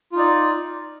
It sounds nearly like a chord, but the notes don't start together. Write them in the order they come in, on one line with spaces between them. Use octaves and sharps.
F4 D#4 D5